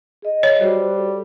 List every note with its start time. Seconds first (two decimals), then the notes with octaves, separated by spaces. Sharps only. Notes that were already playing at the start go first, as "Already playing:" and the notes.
0.22 G#4 D#5
0.43 C#5
0.61 G3 F#4 C5
0.98 A4